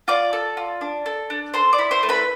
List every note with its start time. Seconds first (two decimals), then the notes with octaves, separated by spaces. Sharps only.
0.08 F4 D5 D6
0.33 A4
0.57 F4
0.81 D4
1.06 A4
1.30 D4
1.54 A4 C5 C6
1.73 D5 D6
1.79 E4
1.91 C5 C6
2.03 A3
2.09 B4 B5